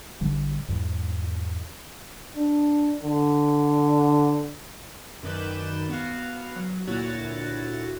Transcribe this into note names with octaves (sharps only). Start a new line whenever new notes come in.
A1 D3 G3
E2 G#2
D4
D3
F#2 D#3 B4 D5 G6 E7
B3 F#4 F5
F#3
D2 A#2 E4 F#4 C#5 A6